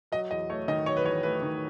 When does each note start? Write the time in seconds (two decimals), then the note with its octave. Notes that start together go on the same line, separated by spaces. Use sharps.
0.12 F#3 D#5
0.31 E2 D#5
0.50 A3 C#5
0.68 D#3 D#5
0.86 F#3 C#5
0.97 B4
1.05 E2 C#5
1.23 A3 B4
1.42 D#3